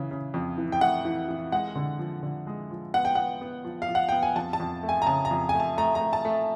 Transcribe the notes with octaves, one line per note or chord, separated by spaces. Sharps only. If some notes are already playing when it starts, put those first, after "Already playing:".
Already playing: C#3 E3
C#3
F2
E3
G5
A3 F#5
E3
E3
G#3 F#5
D3
F3
D3
G#3
F3
B3 F#5
G5
B3 F#5
B3
F3
F5
F3
F#5
B3 G5
G#5
F2 A5
A5
F2
A3
G#5
A#5
C#3 A5
A#5
F2
A3 G#5
A5
A3 A#5
A#5
A3
A5
A3